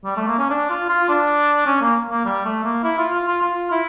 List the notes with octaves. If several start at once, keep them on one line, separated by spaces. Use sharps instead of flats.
G3
A3
A#3
C#4
D4
F4
F4
D4
C#4
A#3
A#3
G3
A3
A#3
E4
F4
F4
F4
F4
E4